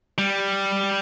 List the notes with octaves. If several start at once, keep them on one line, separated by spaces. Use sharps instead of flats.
G3